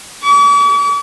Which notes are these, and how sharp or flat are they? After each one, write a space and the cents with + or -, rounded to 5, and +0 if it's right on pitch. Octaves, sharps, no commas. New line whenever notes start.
D6 -45